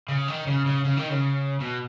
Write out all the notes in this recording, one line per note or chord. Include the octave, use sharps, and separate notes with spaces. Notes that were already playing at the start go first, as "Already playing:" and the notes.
C#3
D#3
C#3
C#3
C#3
D#3
C#3
B2